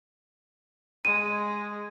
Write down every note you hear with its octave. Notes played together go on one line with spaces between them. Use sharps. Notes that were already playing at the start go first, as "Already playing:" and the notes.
G#3 D#7